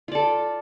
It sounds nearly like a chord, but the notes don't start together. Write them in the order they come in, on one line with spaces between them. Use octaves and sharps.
F4 D5 A4